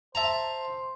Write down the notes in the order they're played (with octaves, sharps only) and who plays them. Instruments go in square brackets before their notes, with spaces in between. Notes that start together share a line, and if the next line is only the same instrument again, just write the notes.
[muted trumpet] C5 [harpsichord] E5 A5 A#5